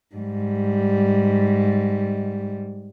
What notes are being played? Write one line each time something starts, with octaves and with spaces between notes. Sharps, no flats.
G#2 G3